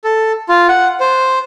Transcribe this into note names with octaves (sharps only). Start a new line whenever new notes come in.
A4
F4
F#5
C5